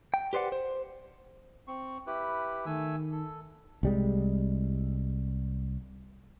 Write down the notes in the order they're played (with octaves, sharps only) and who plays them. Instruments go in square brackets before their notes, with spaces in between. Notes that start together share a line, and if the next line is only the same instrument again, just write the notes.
[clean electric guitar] G5
G4 B4 C5 D5 F#5
C5
[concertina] C4 C#6
E4 G4 B4
[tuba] D#3 [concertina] A3 G#5 E6
[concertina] A4
[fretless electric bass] C2 G3 G#3